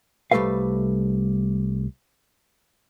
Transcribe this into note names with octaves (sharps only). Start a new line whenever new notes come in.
C2 G3 A3 A4 B4 F5